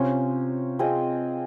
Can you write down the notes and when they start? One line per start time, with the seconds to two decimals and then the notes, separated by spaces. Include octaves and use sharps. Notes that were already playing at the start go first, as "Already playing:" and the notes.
Already playing: C3 C#4 F4 C5
0.79 C4 F4 G#4 D#5